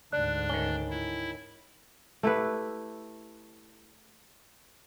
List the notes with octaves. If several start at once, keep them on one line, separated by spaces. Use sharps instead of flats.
D2 G#2 D4 D5 F#6
D#3 C#4 G7
E4
A3 E4 G4 B4